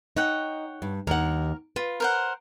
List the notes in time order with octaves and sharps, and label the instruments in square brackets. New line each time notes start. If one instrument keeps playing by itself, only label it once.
[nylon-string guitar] D#4 [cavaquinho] C#5 F#5 G5
[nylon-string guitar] G2
[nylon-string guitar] D#2 F#5 [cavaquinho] A#4
[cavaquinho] F4 [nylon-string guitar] B4
[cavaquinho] A#4 C5 F#5